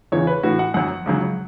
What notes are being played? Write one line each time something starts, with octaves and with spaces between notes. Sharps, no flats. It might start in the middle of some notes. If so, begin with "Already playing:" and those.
E2 C#3 E3 C#5
B4
A2 E3 F#4
F#5
F#2 F#3 F#5
C#2 C#3 F#3